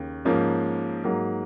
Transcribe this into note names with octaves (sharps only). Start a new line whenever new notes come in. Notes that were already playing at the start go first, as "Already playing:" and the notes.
Already playing: D#2 C#3
G#2 F3 A#3 C#4
G#2 F#3 A#3